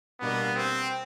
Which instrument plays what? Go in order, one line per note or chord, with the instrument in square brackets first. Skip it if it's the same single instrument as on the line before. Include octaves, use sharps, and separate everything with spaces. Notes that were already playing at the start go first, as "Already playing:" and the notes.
[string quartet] B2 G3 A#3 D4 [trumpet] B3
[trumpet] C4